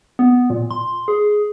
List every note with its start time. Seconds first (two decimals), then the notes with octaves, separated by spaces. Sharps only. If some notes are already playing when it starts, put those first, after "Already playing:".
0.19 B3
0.50 A#2
0.71 C6
1.08 G#4